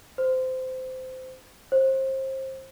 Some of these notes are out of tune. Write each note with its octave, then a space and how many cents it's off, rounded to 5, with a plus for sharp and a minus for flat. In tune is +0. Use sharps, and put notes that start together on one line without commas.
C5 -20
C5 +30